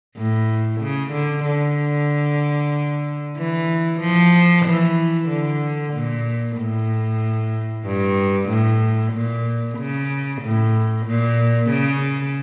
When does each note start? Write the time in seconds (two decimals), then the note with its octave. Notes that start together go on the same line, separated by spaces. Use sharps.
0.17 A2
0.81 C#3
1.12 D3
1.45 D3
3.37 E3
4.01 F3
4.66 E3
5.29 D3
5.94 A#2
6.58 A2
7.86 G2
8.49 A2
9.13 A#2
9.78 C#3
10.42 A2
11.07 A#2
11.70 C#3